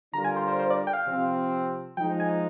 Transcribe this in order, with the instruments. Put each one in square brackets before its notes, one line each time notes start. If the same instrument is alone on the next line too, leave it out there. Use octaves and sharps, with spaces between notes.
[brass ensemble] D3 G3 D4 F4 A#4 [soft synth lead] A#5
[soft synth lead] G#5
C5
C5
C5
D5
G5
F5
[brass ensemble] C3 F3 C4
[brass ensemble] F3 G#3 D#4 [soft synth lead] G5
[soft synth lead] G#5